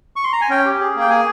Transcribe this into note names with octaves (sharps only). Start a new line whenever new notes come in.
C#6
C6
A#5
G#5
C#4 G5
G4
G#4
A#3 G5
G#4 G#5